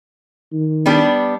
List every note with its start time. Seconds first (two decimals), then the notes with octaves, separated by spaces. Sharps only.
0.52 D#3
0.86 G3 B3 D4 G4